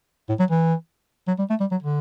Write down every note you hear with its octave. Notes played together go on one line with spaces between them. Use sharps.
A2
F#3
E3
F#3
G3
A3
G3
F#3
D3